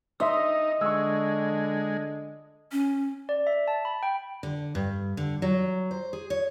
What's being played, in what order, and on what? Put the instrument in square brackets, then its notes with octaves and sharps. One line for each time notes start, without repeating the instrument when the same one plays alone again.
[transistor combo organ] D#4 [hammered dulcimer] D#5 [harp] E5 C6 D#6
[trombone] D3 [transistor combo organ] G#3 [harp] C#6 E6
[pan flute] C#4
[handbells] D5
E5
A5
B5
G5
[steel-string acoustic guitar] D3
G2
D3
F#3
C5
G#4
C#5